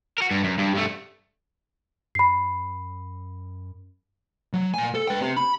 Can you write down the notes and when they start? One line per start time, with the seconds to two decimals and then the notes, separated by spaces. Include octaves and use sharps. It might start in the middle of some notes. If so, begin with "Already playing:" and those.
0.18 F#4 A#4
0.31 G2
0.44 F#2
0.58 G2
0.75 G2 A3
2.15 F#2 B5 C7
4.53 F#3
4.74 A#2 G#5
4.95 A4
5.07 B4 G5
5.21 C4 G4
5.37 B5